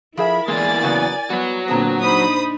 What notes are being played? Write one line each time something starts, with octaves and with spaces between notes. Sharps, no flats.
F3 E4 G#4 A#4 E5 B5
E2 E3 G#3 A#3 D5 G#5 A6
C#3 F#3 B3
F#3 G3 B3 F#4
A#2 D3 B3 C4 G#4 A5 A#5
D4 D#4 C5 B5 D#6